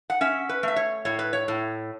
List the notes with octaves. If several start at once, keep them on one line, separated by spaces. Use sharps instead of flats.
F#5
C#4 E5
B4
A3 E5
C#5
A2 C#5
B4
C#5
A2